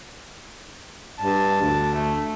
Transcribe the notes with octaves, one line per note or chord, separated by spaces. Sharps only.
G2 A5
D2
A3